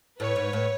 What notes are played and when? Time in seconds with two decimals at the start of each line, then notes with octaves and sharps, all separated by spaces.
0.20 A2 B4 C#5
0.36 G#2
0.53 A2